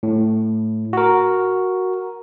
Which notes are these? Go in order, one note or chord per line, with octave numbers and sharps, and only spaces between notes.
A2
F#4 A#4